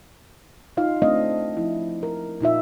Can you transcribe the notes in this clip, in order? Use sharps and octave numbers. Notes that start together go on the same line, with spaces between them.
D#4 F4 F5
A3 C4 D4 D#5 F5
F3 E4
A#4
A#2 D#4 F4 E5